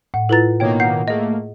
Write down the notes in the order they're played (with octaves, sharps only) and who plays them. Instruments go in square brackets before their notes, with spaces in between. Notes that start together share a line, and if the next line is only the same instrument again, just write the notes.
[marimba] A2 [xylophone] F#5
[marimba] E4 F4 A6 [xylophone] A4 B4 A#5
[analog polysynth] B2 D#3 A#3 [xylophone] C#5 G5
[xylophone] F#5 G6 C7
[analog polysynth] A3 A#3 [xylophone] G#4 D#5